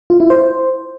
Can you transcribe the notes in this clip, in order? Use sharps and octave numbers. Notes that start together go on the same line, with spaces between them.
F4
E4
C5